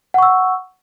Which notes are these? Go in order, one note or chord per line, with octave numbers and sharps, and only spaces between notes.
F#5 C#6 E6